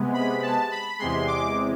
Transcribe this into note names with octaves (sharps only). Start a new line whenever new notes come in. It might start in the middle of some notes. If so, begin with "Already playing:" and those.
Already playing: C3 G#3 B3
B5
A5
B5
E2 C3 G#3 C6
D6